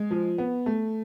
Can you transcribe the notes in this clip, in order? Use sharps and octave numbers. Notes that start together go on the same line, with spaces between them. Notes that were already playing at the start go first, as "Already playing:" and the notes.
Already playing: G#3
F3
B3
A3